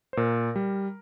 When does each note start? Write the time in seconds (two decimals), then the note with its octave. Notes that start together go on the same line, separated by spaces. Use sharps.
0.13 C5
0.17 A#2 A#4
0.56 G3